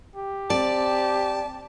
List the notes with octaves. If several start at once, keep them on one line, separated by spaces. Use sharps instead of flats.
G4
C4 D5 A5